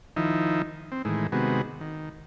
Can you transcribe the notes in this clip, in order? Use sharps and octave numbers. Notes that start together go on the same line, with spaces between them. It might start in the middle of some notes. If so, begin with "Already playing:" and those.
D#3 F3 D#4 E4
C4
A2 D#3 E3 G#3
C3 D#3 G#3 B3 F#4
D#3